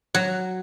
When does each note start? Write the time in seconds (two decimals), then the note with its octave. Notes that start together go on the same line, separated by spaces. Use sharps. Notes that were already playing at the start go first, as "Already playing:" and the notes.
0.14 F#3